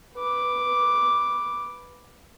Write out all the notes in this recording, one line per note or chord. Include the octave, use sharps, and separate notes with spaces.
B4 D6